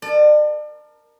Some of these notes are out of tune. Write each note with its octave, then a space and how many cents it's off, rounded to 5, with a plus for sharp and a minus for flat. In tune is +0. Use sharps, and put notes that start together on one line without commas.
A#4 +0 D5 +40 A5 +5